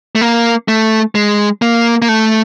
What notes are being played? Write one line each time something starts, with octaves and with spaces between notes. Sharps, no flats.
A3
A#3
A3
G#3
A#3
A#3
A3